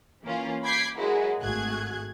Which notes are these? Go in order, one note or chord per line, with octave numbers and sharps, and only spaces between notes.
E3 A#3 C#4 F4
B5 D6 G6 G#6 B6 C7
F#3 G#3 A#3 E4 F#4 G#4
G#1 A3 F#4 G#4 F#6 G#6